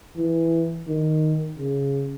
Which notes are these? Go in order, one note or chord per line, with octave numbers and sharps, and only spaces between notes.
E3
D#3
C#3